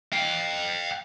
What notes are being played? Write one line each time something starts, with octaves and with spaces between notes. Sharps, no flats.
F5 G5